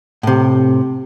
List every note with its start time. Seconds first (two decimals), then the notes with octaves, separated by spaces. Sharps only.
0.23 A2 C3